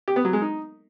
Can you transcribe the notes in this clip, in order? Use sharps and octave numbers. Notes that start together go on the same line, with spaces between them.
G4
B3
F#3
G#3
D#4